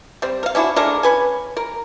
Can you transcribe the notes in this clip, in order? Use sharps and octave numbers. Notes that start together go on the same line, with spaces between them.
G3 C4
A#4 F5
C#4 D4 E4 F#4
G#3 A3 D4 A#4
C#4 B4 G#5
A#4